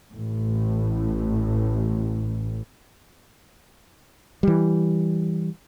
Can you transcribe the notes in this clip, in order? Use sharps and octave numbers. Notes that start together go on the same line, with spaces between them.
A1 A2
E3 G3